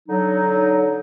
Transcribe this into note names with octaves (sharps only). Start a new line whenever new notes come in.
D3 F#3 D#4